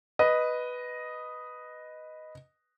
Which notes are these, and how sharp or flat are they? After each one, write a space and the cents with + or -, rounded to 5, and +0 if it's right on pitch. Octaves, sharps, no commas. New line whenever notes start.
B4 +0 D#5 +0